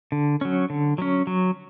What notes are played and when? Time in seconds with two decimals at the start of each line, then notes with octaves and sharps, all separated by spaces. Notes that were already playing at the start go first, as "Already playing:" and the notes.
0.12 D3
0.41 F#3 C#4
0.70 D3
0.98 F#3 C#4
1.27 F#3